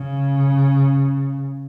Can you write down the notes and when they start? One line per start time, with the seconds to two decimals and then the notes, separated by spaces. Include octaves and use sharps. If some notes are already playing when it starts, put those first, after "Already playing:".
Already playing: C#3